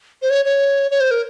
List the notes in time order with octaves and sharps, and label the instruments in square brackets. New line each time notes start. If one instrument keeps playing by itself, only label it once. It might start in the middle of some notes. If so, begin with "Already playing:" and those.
[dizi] C5
C#5
C#5
C#5
C5
A#4